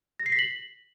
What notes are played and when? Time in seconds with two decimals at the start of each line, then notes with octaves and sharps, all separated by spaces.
0.20 A#6
0.26 C7
0.32 B6
0.39 F#7